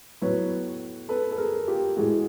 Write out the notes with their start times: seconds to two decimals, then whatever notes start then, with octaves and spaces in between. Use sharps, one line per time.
0.21 A2 F#3 B3 B4 C#5
1.09 A4 B4
1.32 A4
1.38 G#4 A#4
1.67 F4 G4
1.96 A2 E3 G#3 F#4 G#4